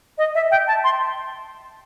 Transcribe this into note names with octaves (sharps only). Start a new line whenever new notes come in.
D#5
E5
G5
A5
C6